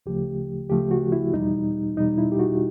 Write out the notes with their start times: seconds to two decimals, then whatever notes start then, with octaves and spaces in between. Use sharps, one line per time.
0.06 D2 C#3 F3 A3 G4
0.70 D2 C#3 F3 A3 G4
0.91 F#4
1.12 E4
1.33 E2 B2 G3 D#4
1.96 E2 B2 G3 D#4
2.18 E4
2.32 G4
2.39 F#4